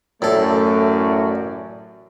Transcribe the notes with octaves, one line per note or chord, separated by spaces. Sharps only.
A1 F#2 A2 A3 A4 D5